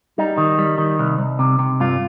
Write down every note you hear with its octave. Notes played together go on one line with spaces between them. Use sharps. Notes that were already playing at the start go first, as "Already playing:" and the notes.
G3 D#4
D#3
G3
D#3
C2
C2
C3
C3
G2 F4